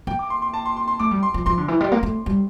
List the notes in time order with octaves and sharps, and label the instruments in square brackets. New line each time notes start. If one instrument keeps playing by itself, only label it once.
[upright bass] A#3 [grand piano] G5
[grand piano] D6
C6
C6
A5
C6
C6
C6
[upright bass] A3 [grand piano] D6
[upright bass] G3
[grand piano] C6
[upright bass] F3
[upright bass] F3 [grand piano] C6
[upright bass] D3
E3
G3
A#3
A3
G3